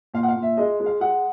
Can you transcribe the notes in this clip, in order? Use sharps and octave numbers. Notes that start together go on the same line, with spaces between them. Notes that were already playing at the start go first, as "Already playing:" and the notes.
A#2 F5
F#5
F5
A#2
E5
G#3 D#5
G#3
F5
G#3 F#5